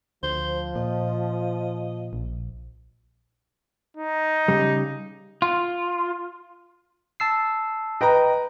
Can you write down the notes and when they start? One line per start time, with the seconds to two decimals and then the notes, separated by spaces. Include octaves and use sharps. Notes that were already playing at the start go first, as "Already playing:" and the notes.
0.23 D2 F3 C5
0.75 A#2 D#5
2.13 A#1
3.97 D#4
4.48 C#3 G3
5.42 F4
7.20 A5 E6 C7
8.01 B4 D#5 G5 A#5